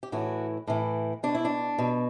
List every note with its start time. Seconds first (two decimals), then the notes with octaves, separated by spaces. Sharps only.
0.03 G4
0.12 A2 E3 F#4
0.67 A2 E3
1.23 B2 D4
1.35 E4
1.45 D4
1.79 B2